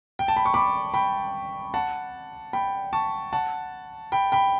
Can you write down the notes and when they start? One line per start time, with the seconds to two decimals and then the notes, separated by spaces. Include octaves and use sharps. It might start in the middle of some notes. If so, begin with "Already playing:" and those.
0.19 G5
0.28 A5
0.37 B5
0.46 C#6
0.54 B5 D6
0.94 G5 B5
1.74 F#5 A5
2.53 G5 B5
2.93 A5 C#6
3.33 F#5 A5
4.12 G5 B5
4.32 G5 B5